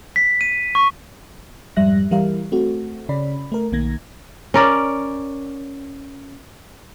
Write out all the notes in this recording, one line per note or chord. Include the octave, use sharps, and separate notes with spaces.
B6
D#7
C#6
F2 G#2 G3 E5 F#6 A#6
E3 G3 E4 A#4 F5
A3 C4 F#4
C#3 C#4 D5 B5
A3 A#4
B1 D#3 A#3 G#6 A#6
C#4 A#4 D5